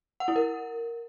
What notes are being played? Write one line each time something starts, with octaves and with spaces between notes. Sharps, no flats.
F#5
E4
A#4